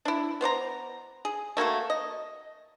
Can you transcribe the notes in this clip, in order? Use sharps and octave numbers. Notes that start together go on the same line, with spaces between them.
D4 E4
B3 C5 D5 A#5
G#4
A3 A#3 F#4 A4
D#5